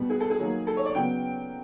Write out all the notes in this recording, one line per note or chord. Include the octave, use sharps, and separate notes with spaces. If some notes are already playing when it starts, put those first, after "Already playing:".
Already playing: B2 G3 B3
G#4
A4
G#4
D#3 F#3 A#3
A4
C#5
D5
C#3 F#3 B3 G5